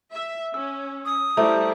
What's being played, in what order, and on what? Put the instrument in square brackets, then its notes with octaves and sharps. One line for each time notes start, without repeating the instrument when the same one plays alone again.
[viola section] E5
[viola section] C#4 [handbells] E6
[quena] D#6
[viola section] G3 E4 [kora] A3 [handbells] C5 A#5